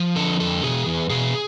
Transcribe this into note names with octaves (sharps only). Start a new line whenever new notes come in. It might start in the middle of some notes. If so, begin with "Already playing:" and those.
Already playing: F3
D3 A4
F2 A4
B2 G#4
E2
B2 G#4